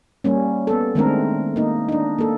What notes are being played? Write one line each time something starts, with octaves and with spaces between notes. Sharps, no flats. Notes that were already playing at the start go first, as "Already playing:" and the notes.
G3 A#3 C#4
B3 A4
D#3 G#3 A3 C4 D4 A#4
A#3 D#4
D4 D#4
A#3 A4